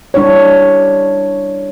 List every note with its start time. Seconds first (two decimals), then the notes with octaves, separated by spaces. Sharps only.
0.14 G3 D4 E4 C#5